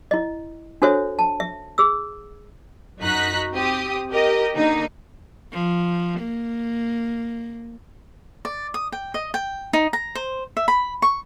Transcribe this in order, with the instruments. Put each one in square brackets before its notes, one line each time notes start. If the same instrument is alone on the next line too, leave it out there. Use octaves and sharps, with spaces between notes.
[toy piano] E4 D#5
D4 F#4 A4 C5 C#5 E5
A5
E5
G#4 E6
[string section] F#2 D#4 F#4 A#5 F#6 B6
C4 G4 D#6
G4 A#4 D#5
D3 A#3 D#4
[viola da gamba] F3
A#3
[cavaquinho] D5
D#6
G5
D#5
G5
D#4
A#5
C5
E5
B5
C#6